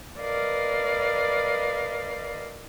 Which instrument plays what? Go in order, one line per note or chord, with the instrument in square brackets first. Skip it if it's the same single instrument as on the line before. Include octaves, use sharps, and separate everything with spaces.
[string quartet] A#4 B4 D5 D#5 F5